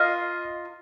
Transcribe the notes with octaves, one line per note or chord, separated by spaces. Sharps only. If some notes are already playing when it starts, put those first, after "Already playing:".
Already playing: F4 A#4 D#5 F5